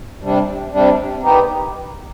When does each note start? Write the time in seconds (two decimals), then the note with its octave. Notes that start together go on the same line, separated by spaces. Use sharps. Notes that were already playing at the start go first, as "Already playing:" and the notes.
0.21 C3 G3 D4
0.72 C3 G3 D4
1.22 D#3 B3 D#4 G4